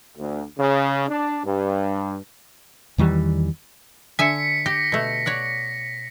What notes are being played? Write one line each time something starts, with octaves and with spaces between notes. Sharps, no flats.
D2
C#3
D4
G2
E2 D#3 E3 G3
D3 E5 G#5 B6 C#7
G4 A#6
B2 A3
C#5 D5 F#5